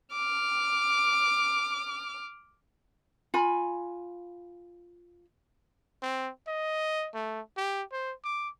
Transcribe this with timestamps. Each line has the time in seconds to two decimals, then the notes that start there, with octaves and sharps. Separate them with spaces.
0.12 D6 F6
3.34 F4 G#5 B5
6.02 C4
6.47 D#5
7.14 A3
7.57 G4
7.92 C5
8.24 D6